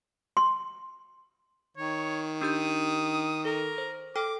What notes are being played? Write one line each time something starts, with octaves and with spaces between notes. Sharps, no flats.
C6
D#3 C#5
D4 G4 D#6 G6
A4 A#4
C5
A4 G5 D6 F6